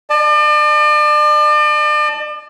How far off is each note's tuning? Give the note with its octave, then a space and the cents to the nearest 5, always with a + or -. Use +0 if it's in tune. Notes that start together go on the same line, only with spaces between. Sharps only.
D5 +40 A5 +0